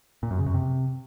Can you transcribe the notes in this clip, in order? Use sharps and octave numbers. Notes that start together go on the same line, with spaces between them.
A#2
F#2
C#3
F#2
C3